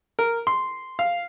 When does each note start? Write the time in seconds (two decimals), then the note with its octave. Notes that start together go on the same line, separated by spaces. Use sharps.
0.19 A#4
0.47 C6
0.99 F5